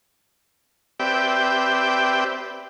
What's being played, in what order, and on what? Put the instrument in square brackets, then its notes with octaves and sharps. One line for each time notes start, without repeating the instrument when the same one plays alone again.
[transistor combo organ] C4 G4 B4 D5 E5 G5